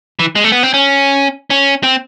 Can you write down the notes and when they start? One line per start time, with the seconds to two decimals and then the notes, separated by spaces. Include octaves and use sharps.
0.19 E3
0.35 G#3
0.44 A3
0.52 B3
0.63 C4
0.74 C#4
1.50 C#4
1.83 C4